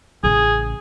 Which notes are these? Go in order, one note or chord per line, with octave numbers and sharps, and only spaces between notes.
A1 C#3 G#4